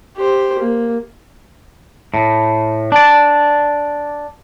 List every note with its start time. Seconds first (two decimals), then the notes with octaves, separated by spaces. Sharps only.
0.16 G4 C5
0.59 A#3
2.14 A2
2.92 D4 D5